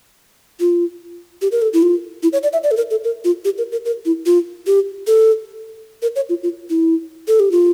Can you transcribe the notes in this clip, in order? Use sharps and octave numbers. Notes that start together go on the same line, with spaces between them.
F4
G4
A#4
A4
E4
F4
E4
C#5
D5
E5
D5
A4
A#4
A4
A#4
F4
G4
A#4
A#4
A#4
E4
F4
G4
A4
A#4
C#5
F4
F4
E4
A4
G4
F4